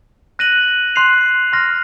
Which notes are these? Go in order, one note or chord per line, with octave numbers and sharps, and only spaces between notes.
F#6 A#6 D#7 F#7
C6 F#6 C7 F7
C6 F6 A#6